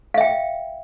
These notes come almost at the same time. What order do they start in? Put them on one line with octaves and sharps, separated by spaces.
F5 E5 G5